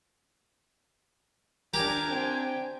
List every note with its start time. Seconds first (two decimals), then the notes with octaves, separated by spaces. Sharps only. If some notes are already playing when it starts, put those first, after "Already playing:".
1.74 D4 G4 A#4 G#5 A#5 D6
2.11 C4 G5